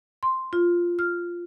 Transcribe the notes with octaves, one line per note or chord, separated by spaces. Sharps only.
C6
F4
F6